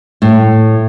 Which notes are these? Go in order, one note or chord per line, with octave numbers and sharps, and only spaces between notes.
A2